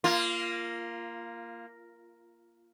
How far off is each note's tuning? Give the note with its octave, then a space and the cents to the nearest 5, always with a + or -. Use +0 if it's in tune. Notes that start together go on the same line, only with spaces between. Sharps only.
A#3 +0 F4 -20